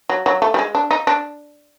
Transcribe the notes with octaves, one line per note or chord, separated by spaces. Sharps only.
F#3
F#3
A3
G3
G#3
D4
D#4
D4